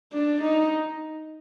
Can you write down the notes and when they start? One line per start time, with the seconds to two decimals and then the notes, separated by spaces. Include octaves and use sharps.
0.13 D4
0.42 D#4